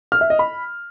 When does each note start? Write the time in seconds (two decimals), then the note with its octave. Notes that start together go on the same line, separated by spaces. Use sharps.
0.12 F6
0.21 E5
0.30 D#5
0.39 B5